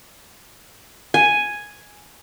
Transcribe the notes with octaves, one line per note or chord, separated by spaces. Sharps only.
G#5